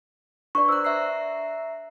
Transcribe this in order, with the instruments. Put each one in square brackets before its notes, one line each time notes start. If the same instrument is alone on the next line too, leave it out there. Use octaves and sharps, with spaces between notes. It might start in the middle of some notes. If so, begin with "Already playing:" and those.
[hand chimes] D4 B4 D5 [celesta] C#6
[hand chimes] C5 A#5 F#6 [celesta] E6
[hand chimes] E5 A#5 C7